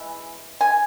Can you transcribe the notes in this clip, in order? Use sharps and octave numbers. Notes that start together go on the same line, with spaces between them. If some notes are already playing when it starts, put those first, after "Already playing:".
Already playing: E3 G#3
G#5